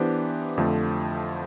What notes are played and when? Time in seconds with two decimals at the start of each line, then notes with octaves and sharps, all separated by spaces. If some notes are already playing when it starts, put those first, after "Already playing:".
Already playing: E3 B3 D4 G4 C5
0.58 F2 D3 F3 A3